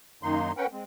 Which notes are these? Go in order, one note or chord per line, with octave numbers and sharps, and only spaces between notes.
F#2 D#3 A#3 D#4 C6
C#4 A#4 B4 F#5 G5
G#3 C4